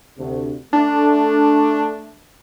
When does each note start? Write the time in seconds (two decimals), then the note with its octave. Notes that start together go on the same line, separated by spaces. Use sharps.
0.18 D2 C3
0.73 A3 D4